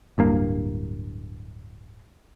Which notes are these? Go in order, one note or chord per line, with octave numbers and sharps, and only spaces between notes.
D1 G2 A#3